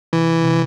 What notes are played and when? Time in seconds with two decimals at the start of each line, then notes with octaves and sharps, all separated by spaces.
0.13 C3 E3
0.44 C3